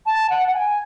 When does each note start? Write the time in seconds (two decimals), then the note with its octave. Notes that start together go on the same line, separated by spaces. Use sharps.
0.06 A5
0.30 F#5
0.48 F#5
0.54 G#5